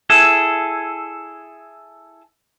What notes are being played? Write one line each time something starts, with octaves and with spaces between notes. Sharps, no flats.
E4 G#4 A4